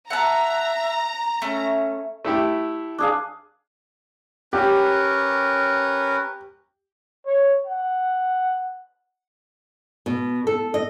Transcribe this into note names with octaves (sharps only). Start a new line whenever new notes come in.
E5 F#5 A5 A#5
A3 C#4
A3 E4 G4
D4 G#4 F5
C#4 G4 A#4 B4
C#5
F#5
B2
A4
D#5